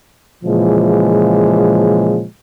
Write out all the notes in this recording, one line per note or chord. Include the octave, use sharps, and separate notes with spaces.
A#2 C#3 E3 F3 G#3